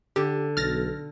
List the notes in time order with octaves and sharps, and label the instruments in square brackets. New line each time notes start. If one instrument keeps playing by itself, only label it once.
[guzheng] D3 [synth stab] G4
[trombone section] B1 [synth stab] F6 A6 A#6